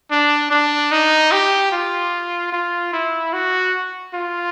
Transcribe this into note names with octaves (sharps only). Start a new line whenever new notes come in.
D4
D4
D#4
G4
F4
F4
E4
F#4
F4